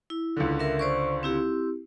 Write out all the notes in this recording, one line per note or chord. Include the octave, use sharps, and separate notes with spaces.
E4
C#2 D3
A#4 E5
C5 D5 C#6
C4 E4 G4